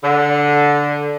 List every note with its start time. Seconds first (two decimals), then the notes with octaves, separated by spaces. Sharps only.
0.04 D3